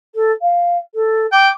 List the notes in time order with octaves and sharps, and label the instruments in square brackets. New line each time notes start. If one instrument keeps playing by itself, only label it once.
[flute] A4
F5
A4
[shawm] G5 [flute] D6